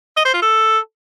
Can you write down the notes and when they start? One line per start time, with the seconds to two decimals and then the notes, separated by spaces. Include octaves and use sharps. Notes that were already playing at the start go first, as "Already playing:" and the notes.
0.17 D#5
0.25 C5
0.34 F4
0.42 A4